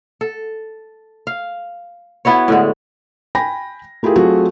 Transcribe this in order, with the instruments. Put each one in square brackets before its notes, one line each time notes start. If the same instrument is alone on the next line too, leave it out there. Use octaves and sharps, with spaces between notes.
[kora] A4
F5
B3 E4 F#4 C#5
A2 D3 G#3
[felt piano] G5 G#5 B5 A#6
A3 E4 F4 G4 G#4 A#4
F#3 A3 C4 F4 F#4 G#4